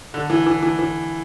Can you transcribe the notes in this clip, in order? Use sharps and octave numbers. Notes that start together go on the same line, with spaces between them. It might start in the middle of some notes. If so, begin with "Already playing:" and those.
D3
E3
E3
E3
E3